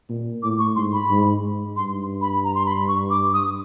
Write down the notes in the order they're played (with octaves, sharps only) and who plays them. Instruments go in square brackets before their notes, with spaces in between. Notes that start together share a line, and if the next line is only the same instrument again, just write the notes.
[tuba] A#2
[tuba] A2 [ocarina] D6
[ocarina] C#6
[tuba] G#2 [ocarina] C6
[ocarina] B5
[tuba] G#2
G#2
[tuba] G2 [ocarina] C6
[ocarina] B5
A#5
C6
B5
C#6
D6
D#6